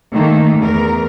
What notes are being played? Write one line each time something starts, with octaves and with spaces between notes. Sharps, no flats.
D#3 A3 A#3
E2 A#4